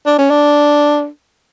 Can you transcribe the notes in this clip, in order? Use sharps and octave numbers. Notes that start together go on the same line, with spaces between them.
D4
C#4
D4